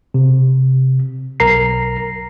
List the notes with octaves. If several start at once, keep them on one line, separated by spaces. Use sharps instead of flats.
C3
B1 A#4 A#5 C7